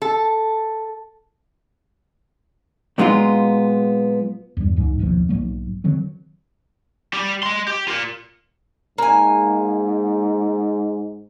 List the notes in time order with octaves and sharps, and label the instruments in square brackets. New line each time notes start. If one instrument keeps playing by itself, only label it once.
[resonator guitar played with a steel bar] A4
[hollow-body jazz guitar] A#2 F#3 G#3 B3 D#4 F4
[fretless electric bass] E2 G2 E3 G3
C#2 G#2 F#3
F#1 D#2 B2 F3
B1 G#2 F#3 A#3
D3 D#3 F#3 C4
[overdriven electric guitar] G3 G4
D#5 C6
G4
F4 A#4
[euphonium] G#2 [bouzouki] A#3 G#5